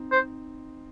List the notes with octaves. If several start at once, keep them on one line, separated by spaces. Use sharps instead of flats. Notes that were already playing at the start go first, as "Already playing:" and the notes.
Already playing: C4 D#4
C5